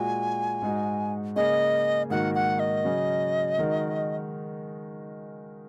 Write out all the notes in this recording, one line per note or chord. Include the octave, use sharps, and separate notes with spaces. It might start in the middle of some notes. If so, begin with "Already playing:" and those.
Already playing: A#2 G#3 F#4 G#5
G#2 G#3 D#4 F#4
C#3 A#3 C#4 G#4 D#5
G#2 D#3 A#3 F#4 A#4 F#5
F#5
D#5
C#3 F#3 C#4
D#3 G#3 D#4 F#4 A#4